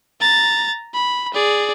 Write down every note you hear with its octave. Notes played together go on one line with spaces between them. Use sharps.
A#5 A6
B5
G#4 D5